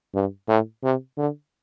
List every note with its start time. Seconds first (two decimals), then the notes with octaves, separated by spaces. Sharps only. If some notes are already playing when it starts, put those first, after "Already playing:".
0.14 G2
0.48 A2
0.83 C3
1.17 D3